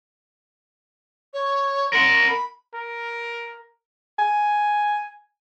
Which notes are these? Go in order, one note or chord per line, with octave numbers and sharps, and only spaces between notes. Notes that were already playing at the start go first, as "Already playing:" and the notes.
C#5
A#4 F#5 C6
B5
A#4
G#5